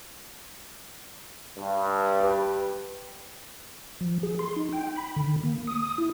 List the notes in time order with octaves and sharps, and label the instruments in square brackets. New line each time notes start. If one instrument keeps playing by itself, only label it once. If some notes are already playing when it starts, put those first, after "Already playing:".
[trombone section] G2
[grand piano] G4 B4
[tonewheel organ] F3
G#4
C6
D#4
G5
B5
D3
A#3
D#6
E4